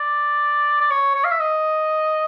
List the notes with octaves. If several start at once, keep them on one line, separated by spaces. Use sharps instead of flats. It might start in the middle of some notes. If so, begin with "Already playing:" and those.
Already playing: D5
D5
C#5
C#5
F5
E5
D#5